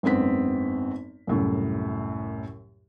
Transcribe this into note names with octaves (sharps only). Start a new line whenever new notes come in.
G#1 F#2 B3 C4 B6
C2 F#2 A2